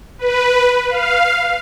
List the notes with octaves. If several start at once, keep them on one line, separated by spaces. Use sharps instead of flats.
B4
F5